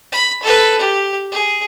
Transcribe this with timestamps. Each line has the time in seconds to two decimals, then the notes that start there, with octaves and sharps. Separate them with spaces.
0.12 B5
0.43 A4 B4
0.79 G4
1.32 G#4